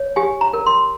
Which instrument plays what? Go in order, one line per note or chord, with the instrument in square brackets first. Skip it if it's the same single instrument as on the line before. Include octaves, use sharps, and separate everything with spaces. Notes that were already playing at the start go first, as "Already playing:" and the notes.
Already playing: [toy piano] C#5
G4 G#5
A#5
A#4
C6